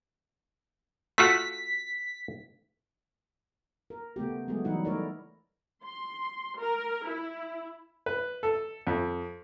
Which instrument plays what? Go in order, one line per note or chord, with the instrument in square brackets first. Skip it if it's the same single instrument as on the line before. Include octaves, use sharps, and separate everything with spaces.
[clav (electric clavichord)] A3 F4 F#4 [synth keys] B6
[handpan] A#4
C#3 A3 B3 G4
F#3 G#3 A3 B3 G#4
E3 F#3 G3 D#4 E4 F#5
A3 D#4 E4 A#4 C#5 D5
[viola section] C6
A#4
E4
[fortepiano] B4
A4
F2